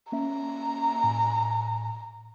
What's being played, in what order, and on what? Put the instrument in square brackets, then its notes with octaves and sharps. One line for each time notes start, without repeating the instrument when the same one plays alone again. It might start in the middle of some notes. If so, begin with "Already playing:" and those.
[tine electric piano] A#3 C#4 E5 [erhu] A#5
[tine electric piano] A2 G#5